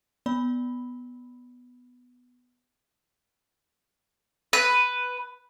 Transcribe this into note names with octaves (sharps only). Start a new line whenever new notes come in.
B3 D5 B5
B4